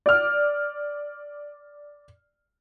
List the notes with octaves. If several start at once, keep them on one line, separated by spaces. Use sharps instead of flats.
D5 F6